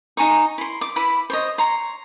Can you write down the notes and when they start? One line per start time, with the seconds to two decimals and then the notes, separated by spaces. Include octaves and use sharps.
0.17 D#4 G#5 A#5 C#6
0.58 E4 C6
0.81 D6
0.96 E4 B4 B5 D6
1.30 C5 C#5 D#5
1.58 C#5 A#5 C6